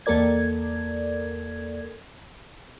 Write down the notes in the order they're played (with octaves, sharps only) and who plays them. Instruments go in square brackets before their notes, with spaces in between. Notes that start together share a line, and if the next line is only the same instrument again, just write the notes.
[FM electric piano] E2 A#3 A4 A#4 D5 G#6